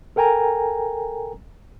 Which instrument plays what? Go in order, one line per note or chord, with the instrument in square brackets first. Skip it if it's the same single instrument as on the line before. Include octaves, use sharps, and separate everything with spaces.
[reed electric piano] A4 A#4 G5 G#5 A#5